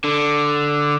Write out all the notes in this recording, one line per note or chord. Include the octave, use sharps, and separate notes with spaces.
D3